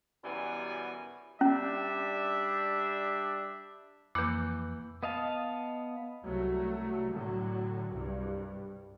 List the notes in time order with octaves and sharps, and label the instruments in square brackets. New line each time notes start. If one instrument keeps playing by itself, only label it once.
[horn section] F#2 B2 E3 G3 G#5
[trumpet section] G3 D4 E5 [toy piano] C#4
[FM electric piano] F2 B4 [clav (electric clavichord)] E3 F#5 [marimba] A#3 [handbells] D6 G6
[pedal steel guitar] B3 D#5 F5 A5
[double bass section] C2 F#3 A3
A2 D3 F#3
C2 G2